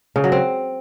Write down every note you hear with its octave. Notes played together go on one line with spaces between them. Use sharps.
C#3
F#3
C4